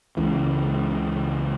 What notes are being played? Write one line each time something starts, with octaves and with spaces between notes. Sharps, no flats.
C#2 C#3 E3